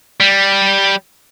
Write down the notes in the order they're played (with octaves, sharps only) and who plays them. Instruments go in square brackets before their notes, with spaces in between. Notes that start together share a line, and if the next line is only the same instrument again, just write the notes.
[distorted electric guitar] G3